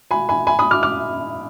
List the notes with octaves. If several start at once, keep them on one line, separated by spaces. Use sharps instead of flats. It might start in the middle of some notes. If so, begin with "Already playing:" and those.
G#5 B5
G#5 B5
G#5 B5
B5 D#6
D6 F6
D6 F6